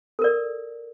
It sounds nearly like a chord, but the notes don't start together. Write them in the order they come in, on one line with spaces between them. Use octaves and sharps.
A4 A#4 D5